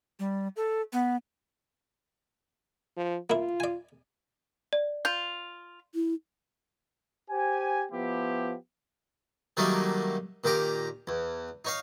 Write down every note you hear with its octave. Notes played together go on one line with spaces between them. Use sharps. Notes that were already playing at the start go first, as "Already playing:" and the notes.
G3
A4
B3
F3
A#3 E4 F4
D5 G#5
D5
F4 G6
E4
G4 C5 G#5
F3 B3 E4 G4
D#3 F#3 G3 A3 A#3 D#4
A#2 D#3 G4 A#5
E2
D#4 C#5 F5